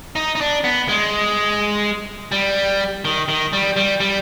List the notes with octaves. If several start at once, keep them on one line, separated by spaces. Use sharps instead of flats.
D#4
D#4
D4
B3
G#3
G3
D#3
D#3
G3
G3
G3